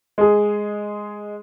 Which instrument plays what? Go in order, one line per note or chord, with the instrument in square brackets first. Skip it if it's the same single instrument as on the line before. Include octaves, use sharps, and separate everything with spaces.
[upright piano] G#3 G#4